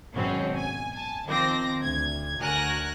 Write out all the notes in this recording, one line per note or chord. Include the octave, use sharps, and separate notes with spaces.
G#1 F#2 B2 C4 C#4
G#5
G#5 A5
D#3 F3 C4 C5 D6 A#6
D2 G#6
D2 F#4 A#4 G#5 F#6 A#6